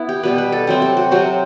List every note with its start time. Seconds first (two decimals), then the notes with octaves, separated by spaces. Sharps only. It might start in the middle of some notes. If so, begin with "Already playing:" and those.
Already playing: B3 E4
0.09 G4
0.23 B2 G3 B3 B4
0.38 B4
0.52 A4
0.67 C3 F#3 C4 G4
0.82 G4
0.97 F#4
1.11 C3 F#3 C4 G4